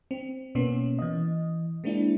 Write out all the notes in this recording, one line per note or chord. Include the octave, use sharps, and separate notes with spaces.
C4
B2 A#3 B3 C#4
E3 D#5
G#3 A#3 C4 D4 E4